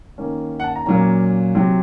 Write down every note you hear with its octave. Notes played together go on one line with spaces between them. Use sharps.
D#3 A#3 C#4
F#5
A5
A#5
A#2 F#3 A#3 C#4 A#5
C3 F#3 C4